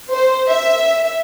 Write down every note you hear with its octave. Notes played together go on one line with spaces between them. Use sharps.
C5
E5